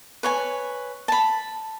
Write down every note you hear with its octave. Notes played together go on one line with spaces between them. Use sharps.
B4 C#5 G#5
A5 B5